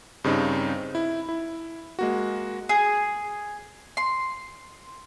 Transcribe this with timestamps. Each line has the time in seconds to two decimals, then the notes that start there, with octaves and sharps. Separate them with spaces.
0.24 G2 C#3 C4 D#4
0.95 E4
1.29 E4
1.99 G#3 A#3 F#4
2.69 G#4
3.97 C6